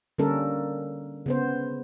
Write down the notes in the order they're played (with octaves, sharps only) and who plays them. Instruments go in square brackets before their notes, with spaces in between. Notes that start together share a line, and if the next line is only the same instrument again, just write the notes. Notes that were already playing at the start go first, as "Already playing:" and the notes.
[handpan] D3 G3 A#3 C#4 A4 A#4
C#3 B3 C5